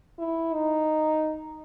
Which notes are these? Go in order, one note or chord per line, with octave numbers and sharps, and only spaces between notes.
E4
D#4